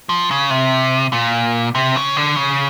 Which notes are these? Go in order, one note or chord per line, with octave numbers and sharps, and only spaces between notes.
F3
C#3
C3
A#2
C3
C#3
D3
C#3